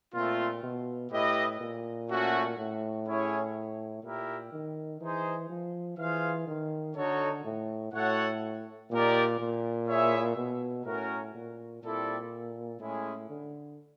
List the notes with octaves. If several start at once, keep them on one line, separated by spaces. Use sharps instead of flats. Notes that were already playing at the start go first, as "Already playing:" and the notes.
A#2 A3 C4 F4
B2
A2 E4 G4 B4 D#5
A#2
A3 C#4 F#4
A2
C#4 E4 G#4 C#5
A#2 E4 G4 A#4
D#3
E3 D#4 G#4 C5
F3
E3 F4 G#4 C5 F5
D#3
D3 D#4 F#4 A4 C#5
A2
A2 F#4 A4 C#5 F#5
A#2 D#4 G4 A#4 D5
A#2
E4 G#4 C#5 E5
B2
A2 C#4 F#4 A#4
A#2
A#2 G3 C4 E4 A4 D5
A2 G#3 C#4 E4 G#4
D3